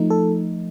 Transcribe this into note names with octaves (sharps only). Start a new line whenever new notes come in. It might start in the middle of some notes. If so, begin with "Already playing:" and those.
Already playing: F3 A3 D#4
A4